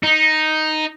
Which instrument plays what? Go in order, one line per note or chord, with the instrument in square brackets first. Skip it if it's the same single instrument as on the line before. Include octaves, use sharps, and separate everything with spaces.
[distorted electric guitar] D#4